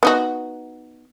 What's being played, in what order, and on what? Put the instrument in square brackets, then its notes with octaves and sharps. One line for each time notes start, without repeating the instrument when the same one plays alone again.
[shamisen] B3 D#4 F#4